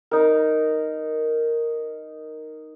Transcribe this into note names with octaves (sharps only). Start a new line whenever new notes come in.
D#4 A#4